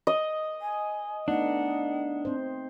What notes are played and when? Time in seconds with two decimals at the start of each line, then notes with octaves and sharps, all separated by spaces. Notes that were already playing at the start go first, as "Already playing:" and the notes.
0.07 D#5
0.62 G#5
1.28 A3 B3 D4 D#4 F#5
2.25 C4 C5